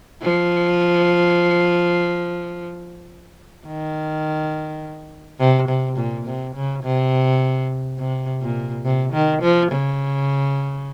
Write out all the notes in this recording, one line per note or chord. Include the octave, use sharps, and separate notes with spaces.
F3
D#3
C3
C3
A#2
C3
C#3
C3
C3
A#2
C3
D#3
F3
C#3